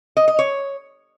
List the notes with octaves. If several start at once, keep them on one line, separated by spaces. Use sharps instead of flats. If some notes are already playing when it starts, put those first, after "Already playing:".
D#5
D#5
C#5